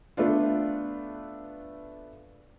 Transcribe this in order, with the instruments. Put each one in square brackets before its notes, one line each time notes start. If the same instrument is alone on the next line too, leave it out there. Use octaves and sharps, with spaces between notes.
[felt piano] A3 B3 D4 F4